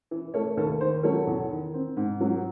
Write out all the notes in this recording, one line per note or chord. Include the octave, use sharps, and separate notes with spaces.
E3
A3 A4 C#5
D#2 A4
D#3 C5
F#3 A4 C#5
E2
D#3
C4
G#2
F#3